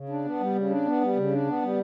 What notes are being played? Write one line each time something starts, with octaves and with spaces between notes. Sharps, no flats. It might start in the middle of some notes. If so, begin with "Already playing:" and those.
Already playing: C#3
D4
B3
G3
C#3
D4
B3
G3
C#3
D4
B3
G3